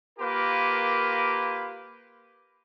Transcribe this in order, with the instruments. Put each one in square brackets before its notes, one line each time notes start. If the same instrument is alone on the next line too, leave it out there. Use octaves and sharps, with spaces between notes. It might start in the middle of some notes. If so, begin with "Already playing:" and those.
[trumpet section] A#3 F4 G4 A#4 B4